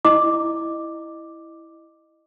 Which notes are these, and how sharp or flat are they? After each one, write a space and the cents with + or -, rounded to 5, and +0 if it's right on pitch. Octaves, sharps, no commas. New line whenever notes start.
E4 +0 D#5 -20 D6 +0